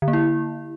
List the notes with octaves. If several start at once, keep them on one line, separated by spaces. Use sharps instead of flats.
D3
A#3
E4